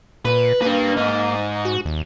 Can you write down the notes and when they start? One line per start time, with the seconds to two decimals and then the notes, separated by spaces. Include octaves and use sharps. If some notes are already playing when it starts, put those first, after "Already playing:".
0.25 A#2 B4
0.62 A#3 D4 B4
0.97 G#2 D#5
1.65 F#4
1.85 D#2